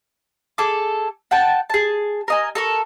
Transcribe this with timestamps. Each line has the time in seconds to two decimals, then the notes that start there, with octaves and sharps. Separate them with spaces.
0.58 G#4 A4 D6
1.31 F#5 G5 A5
1.70 G#4 A5
2.28 A#4 D#5 G#5
2.55 A4 A#4 C#6